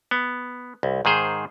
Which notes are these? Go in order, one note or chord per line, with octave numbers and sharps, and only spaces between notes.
B3
C2
G#2 D#3 G#4 C5